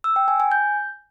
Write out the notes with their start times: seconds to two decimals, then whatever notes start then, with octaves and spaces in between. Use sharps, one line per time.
0.04 E6
0.16 G5
0.28 G#5
0.40 G#5
0.52 G6